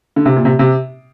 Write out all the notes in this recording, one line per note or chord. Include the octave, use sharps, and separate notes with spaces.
D3
C3
A#2
C3
C3